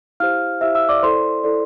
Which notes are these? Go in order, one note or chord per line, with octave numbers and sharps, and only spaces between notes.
E4 G4 C5 F5 F6
E4 G4 C5 E5 E6
E5 E6
D5 D6
E4 A4 C5 D5 C6
E4 A4 D5